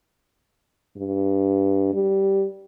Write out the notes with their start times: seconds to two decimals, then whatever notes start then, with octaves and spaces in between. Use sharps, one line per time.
0.97 G2
1.94 G3